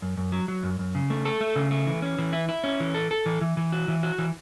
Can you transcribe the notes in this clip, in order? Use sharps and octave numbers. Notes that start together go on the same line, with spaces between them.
F#2
F#2
F#3
F#3
F#2
F#2
C#3
A3
A4
A3
C#3
A3
E3
C#4
E3
E4
E4
C#4
E3
A4
A4
E3
E3
E3
F#4
E3
F#4
E3